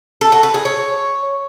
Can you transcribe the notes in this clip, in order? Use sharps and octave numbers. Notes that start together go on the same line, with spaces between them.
A4
F#4
B4
G#4
C#5